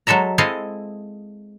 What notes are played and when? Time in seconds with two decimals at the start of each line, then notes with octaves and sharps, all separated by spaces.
0.07 F#3 G#3 A4 E5 A#5
0.38 G#3 C4 E4 A4 D#5 F5